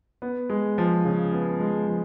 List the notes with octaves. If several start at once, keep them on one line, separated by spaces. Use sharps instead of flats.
B3
G#3
F3
C#3
B3
G#3
F3